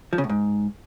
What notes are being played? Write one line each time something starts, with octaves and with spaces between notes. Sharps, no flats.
F3
C#3
A2
G#2